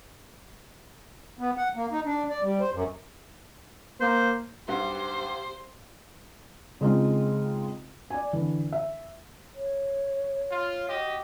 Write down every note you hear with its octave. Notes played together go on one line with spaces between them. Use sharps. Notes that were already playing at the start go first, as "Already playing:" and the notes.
B3
F#5
A#3
D#4
D4
D5
G3
C5
F#2
A#3 C5
B1 G2 G4 C5 F#5
C#3 G#3 C4 D#4 F4
D5 G#5
D3 E3
E5
C#5
F4
F#4 G4 D#5